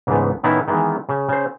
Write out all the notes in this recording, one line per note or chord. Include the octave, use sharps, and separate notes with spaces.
C#2 G#2 E3 G#3 A3 B3
A2 D#3 B3 C#4 D#4 E4
D#3 E3 G#3 B3
C#3
C#3 C5